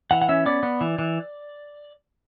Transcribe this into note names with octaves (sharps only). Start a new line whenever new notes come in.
E3 F#5
F#5
C#4 E5
B3 D5
B3
E3
E3